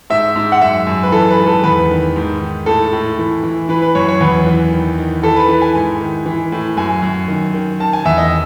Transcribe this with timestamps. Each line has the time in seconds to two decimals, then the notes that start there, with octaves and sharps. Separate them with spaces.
0.10 G#2 E5
0.36 G#2
0.52 F#5
0.62 F#2 E5
0.87 F#2
1.03 B4
1.12 E3 A4
1.30 B4
1.39 G#2
1.47 A4
1.64 E2 B4
1.90 D#3
2.16 G#2
2.41 D#3
2.66 A2 A4
2.93 A2
3.19 E3
3.43 E3
3.69 E3 B4
3.82 B4
3.95 F#2 C#5
4.09 C#5
4.21 E2 B4
4.46 E3
4.72 D#3
4.98 D#3
5.23 E3 A4
5.36 B4
5.48 E3
5.62 G#5
5.75 G#2
6.01 D#3
6.26 E3
6.52 A2
6.77 F#2 G#5
7.02 F#2
7.28 D#3
7.54 D#3
7.80 D#3 A5
7.93 G#5
8.05 E2 E5
8.18 D#5